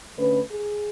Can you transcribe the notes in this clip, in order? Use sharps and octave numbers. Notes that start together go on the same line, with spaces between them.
D3 A3 C#4 B4
G#4